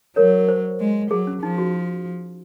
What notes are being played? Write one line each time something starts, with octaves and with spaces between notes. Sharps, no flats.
F#3 A#4 C#5
C5
G#3
F#3 G#4
C#4
F3 D#4
F#4